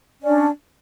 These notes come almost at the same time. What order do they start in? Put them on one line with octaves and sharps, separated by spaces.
C#4 D5 D4